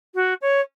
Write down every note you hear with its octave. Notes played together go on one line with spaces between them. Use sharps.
F#4
C#5